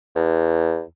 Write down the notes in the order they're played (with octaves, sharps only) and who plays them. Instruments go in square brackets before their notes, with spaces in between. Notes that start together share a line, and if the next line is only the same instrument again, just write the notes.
[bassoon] E2